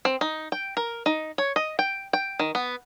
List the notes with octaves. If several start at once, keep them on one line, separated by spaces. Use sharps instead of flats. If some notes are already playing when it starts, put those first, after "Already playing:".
C4
D#4
G5
A#4
D#4
C#5
D#5
G5
G5
D#3
B3